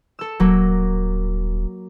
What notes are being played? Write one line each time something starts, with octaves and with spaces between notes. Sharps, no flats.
A4 E6
D#1 F#3 A#3